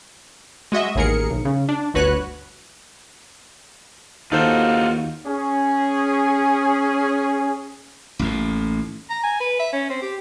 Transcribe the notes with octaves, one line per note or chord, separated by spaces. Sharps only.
G#3 F#4 D#5 E5
A1 D#2 G#4 A#4 C#7
B1
C#3
D4
G1 D2 F#4 B4 C#5 F#6
D#2 D#4 F4 F#4 A4 C5
C#4 G#4
A1 D#2 A2
A#5
G#5
B4
E5
C#4
C4
G4